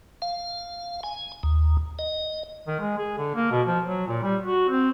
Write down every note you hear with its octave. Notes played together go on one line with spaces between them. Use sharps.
F5
G#5
D#2
D#5
D#3
G#3
G#4
D3
A#3
B2
F3
F#3
A#2
G3
F#4
C4